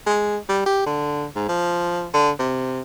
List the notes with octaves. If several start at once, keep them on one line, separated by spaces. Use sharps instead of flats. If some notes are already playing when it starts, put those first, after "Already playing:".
G#3
G3
G4
D3
G#2
F3
D3
C3